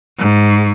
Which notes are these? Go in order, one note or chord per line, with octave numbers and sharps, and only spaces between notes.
G#2